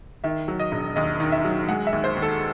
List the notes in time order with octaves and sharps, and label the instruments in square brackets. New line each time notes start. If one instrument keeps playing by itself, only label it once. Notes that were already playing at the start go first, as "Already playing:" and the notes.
[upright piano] D#3 E5
F#3
D#5
E1
D#2 D#5
D#3
E5
F#3
G#3 F#5
E5
D#2
C5
D#2
A4